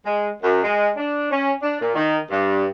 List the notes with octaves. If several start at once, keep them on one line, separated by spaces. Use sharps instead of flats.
G#3
F#2
G#3
D4
C#4
D4
A#2
D#3
G2